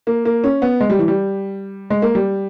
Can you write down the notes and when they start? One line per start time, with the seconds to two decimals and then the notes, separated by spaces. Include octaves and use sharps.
0.07 A#3
0.25 A#3
0.44 C#4
0.62 B3
0.80 G#3
0.90 G3
0.99 E3
1.08 G3
1.90 G#3
2.02 A#3
2.15 G3